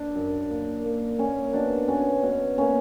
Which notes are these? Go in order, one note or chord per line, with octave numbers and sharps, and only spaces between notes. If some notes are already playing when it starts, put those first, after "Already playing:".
Already playing: D4
F#2
A#3
A#3
A#3 C#4
B2 D4
B2 C#4
B2 C#4
A#3 C#4